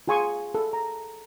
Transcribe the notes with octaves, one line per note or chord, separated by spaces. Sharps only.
F4 G#4 G#5 C6 C#6 D#6
A4
A#5